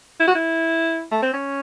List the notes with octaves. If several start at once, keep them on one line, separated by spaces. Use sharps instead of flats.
E4
F#4
E4
A3
C4
C#4